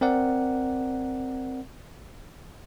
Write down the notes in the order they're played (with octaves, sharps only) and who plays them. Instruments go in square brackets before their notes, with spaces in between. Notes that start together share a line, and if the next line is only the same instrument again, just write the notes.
[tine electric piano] C4 A#4 D5 F#5